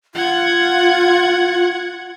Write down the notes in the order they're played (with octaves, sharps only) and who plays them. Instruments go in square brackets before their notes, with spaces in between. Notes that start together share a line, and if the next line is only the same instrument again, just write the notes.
[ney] F4 [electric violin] F#5 G#6